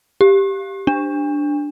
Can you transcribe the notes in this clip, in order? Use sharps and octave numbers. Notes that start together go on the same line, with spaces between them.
G4
D4